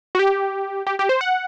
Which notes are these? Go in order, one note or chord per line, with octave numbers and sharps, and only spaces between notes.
F#4
G4
G4
G4
C5
F#5